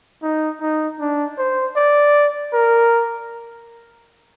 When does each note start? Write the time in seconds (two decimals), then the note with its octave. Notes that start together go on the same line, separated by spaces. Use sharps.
0.23 D#4
0.61 D#4
1.00 D4
1.39 C5
1.76 D5
2.54 A#4